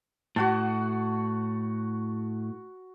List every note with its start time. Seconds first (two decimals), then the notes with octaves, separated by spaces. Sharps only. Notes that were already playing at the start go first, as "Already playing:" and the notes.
0.36 A2 F#4 F#5 A5